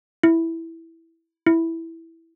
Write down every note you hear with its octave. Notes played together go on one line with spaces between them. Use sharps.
E4
E4